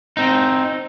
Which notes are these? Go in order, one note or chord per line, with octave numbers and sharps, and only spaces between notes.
C4 D#4